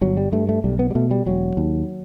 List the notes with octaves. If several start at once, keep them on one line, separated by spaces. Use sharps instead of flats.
G1 F#3
G3
G2 A3
A3
B1 G3
B3
G3
B2 A3
G3
E1 F#3
D#2